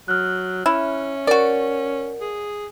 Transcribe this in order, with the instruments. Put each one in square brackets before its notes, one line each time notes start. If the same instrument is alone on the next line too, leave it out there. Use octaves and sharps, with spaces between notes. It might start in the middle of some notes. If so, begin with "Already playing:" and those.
[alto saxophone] F#3 [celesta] F6 F#6
[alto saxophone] C#4 [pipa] E4
[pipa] F#4 D5 [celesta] A#4
[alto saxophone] G#4